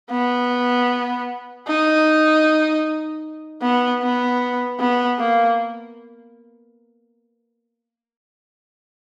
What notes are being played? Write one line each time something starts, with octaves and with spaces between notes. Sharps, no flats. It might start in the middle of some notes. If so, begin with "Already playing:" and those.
B3
D#4
B3
B3
B3
A#3